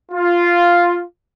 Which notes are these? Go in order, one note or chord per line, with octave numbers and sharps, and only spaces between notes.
F4